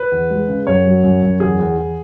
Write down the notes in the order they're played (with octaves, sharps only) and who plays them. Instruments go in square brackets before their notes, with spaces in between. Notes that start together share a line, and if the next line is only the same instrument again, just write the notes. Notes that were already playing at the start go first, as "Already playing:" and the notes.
Already playing: [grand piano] B4
E2
G#3
C#3
F#2 C#5
F#3
F#2
F#2
E2 G#4
E2
E2